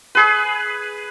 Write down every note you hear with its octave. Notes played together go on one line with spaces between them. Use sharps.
G#4 B4